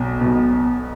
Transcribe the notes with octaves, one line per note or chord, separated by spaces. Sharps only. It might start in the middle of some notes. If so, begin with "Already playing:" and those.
Already playing: B1 B2
B1 B2